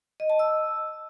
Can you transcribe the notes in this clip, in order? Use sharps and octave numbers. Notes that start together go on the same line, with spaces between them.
D#5
A5
E6